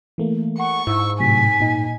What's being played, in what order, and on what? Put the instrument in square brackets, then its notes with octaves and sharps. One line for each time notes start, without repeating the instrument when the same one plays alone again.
[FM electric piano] E3 A3 A#3
[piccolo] F#5 [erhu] C#6
[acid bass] G#2 [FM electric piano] E4 [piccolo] E6
[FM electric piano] A2 C3 F#3 [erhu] G#5 [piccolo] B6
[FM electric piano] A#2 D#4